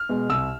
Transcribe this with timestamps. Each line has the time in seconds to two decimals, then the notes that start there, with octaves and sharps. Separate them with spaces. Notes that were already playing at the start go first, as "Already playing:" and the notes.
Already playing: F6
0.09 B2 G#3
0.30 C2 E6